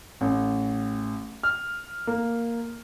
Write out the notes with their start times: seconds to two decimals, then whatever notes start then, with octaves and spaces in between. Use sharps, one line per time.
0.21 A1
1.43 F6
2.07 A#3